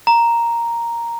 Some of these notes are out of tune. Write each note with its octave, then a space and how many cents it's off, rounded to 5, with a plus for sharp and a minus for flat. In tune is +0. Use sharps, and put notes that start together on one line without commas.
A#5 +0